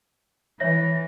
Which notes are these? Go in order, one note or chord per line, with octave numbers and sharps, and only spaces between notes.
E3 C#5 E5 A#6